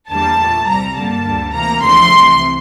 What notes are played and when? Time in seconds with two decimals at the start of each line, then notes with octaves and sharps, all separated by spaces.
0.10 E2 D3 G3 A#3 A5
0.39 A#2 A3
0.68 C2 C3 G3 A#5
0.97 G2 D3 G3 A#3 A5
1.25 D2 D3 G3
1.54 D2 C3 E3 A#3 A#5
1.83 E2 D3 F3 A3 C6
2.12 C2 C3 E3